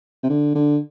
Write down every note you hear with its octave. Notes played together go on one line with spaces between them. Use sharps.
C3
D3
D3